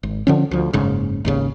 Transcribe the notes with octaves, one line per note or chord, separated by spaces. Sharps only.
G#1
D3 F3 C#4
D2 F3
F#1 G#2 C#3
G#1 D#2 C#3